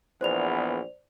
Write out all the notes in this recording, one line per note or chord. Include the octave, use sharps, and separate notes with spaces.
A#1 E2 B3 C5 D5 F7